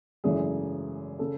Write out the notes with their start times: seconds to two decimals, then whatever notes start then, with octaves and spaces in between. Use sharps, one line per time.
0.24 G#1 F#2 C#3 E3 A3 G#4
1.19 C#3 A4